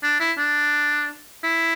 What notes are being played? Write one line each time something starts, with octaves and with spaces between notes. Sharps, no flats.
D4
E4
D4
E4